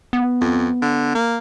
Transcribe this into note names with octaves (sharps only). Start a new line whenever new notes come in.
B3
F2
D3
A#3